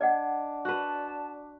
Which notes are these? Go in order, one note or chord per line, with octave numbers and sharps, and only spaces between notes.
D4 D5 D#5 F#5
F#4 B4 A5